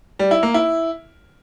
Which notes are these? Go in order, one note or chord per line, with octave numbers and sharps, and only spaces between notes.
G3
E4
A#3
E4